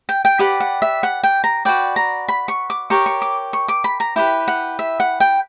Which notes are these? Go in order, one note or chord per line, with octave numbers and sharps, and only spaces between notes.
G5
G5
G4 B4 D5 F#5
F#5
E5
F#5
G5
A#5
F#4 B4 D5 G5
A#5
B5
C#6
D6
G4 A#4 C#5 C#6
C#6
D6
C#6
D6
B5
A#5
E4 G4 B4 G5
F#5
E5
F#5
G5